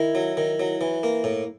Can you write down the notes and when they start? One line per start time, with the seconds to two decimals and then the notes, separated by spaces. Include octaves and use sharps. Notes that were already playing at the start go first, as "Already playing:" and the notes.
Already playing: D#3 E4
0.15 F#3
0.37 D#3
0.60 F#3
0.81 E3
1.03 A#3
1.24 A2